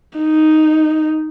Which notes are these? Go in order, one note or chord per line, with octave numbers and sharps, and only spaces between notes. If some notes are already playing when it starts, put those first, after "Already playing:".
D#4